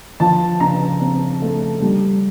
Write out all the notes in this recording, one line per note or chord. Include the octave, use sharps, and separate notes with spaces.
F3 A5
C#3 A#5
C4
A3
G3